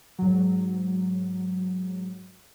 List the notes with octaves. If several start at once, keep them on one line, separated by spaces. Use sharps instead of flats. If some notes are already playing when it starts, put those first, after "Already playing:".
G#2 F#3